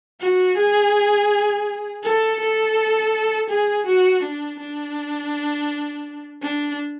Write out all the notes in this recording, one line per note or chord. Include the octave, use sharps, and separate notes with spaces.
F#4
G#4
A4
A4
G#4
F#4
D4
D4
D4